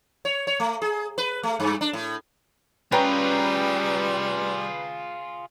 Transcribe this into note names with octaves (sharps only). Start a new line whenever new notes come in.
C#5
C#5
A3
G#4
B4
A3
G2
D4
A2
G3 C#4 F4 G#4 B4 G5 A#5